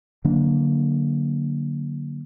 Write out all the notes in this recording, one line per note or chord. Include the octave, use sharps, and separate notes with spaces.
D3 F#3 A#3 D4